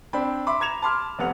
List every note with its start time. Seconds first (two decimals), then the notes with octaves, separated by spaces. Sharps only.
0.13 C4 D4 G5 B5
0.47 E5 B5 C6 D6
0.60 A#5 G#6 E7 F7
0.82 A5 B5 C6 D6 F6
1.19 F1 B3 F#5 F7